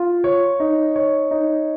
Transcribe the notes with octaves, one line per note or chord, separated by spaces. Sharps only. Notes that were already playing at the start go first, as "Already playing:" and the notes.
Already playing: F4
C#5
D#4
C#5
D#4